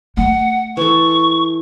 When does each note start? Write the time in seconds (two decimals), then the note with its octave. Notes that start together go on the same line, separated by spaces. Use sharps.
0.17 A3 F#5
0.77 E3 A4 C#6